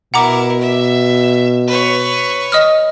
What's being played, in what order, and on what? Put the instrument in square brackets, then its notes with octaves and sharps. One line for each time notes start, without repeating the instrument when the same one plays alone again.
[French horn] B2 [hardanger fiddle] E4 A#4 [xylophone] F#5 A#5 D6
[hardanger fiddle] E5
B4 C#5
[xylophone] D#5 D#6 F6